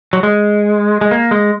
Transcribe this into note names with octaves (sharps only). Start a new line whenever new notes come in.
F#3
G#3
G#3
A#3
G#3